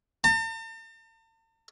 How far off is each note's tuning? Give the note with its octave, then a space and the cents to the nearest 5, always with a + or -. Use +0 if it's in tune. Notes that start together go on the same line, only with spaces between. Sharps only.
A5 +45